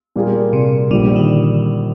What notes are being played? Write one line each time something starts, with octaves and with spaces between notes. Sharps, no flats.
A#2 G3 A#3 F4 G#4
C3
A#1 A#2 D3 G3
D#3